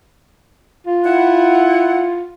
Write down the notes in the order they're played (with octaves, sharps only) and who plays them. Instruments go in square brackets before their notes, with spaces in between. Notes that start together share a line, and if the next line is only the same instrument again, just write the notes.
[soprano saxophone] F4
[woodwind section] E4 F#5